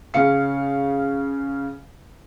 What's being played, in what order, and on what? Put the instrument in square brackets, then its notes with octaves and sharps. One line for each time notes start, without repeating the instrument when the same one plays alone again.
[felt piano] C#3 C#4 F5 C#7